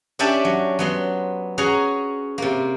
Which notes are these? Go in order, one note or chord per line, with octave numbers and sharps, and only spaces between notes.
C#4 D4 G4 D5 E5 A5
F#3
F#3 B3 C6
C#4 F#4 G#4 C#5 A#5
C3 A#3